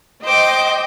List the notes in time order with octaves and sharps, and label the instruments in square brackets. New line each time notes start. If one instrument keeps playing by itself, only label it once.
[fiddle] C5 D6 [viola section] D#5 G5